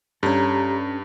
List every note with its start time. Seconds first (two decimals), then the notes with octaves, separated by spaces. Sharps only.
0.23 G2 C#4 G4 A4 A#5